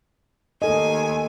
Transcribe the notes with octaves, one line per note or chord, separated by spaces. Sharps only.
D#2 A4 D#5 G#5